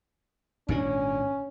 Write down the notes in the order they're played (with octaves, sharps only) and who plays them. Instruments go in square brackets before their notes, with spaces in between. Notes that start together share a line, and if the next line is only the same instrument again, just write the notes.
[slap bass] G#1 A#2 D4 [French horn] C#4